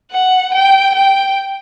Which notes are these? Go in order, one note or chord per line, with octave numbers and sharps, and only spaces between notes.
F#5
G5
G5